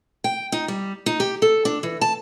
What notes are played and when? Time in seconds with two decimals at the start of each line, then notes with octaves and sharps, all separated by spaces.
0.24 G5
0.52 D#4
0.68 G3
1.06 D#4
1.20 G4
1.42 A4
1.65 D4
1.83 E3
2.01 A5